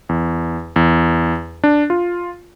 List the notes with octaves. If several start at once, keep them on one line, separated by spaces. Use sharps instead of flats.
E2
E2
D4
F4